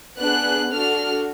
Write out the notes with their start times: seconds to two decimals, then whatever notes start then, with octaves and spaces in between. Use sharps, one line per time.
0.19 B3 D4 G#4 F#6
0.73 D4 F#4 A4 F6